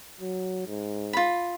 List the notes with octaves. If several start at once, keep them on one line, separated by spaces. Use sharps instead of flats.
F#3
G#2
F4 B5